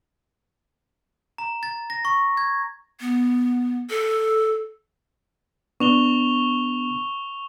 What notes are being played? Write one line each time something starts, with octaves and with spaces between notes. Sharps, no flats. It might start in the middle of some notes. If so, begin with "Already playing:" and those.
A#5
A6
A#6
C#6
G#6
B3
A4
B3 D4 C#6 F7 G7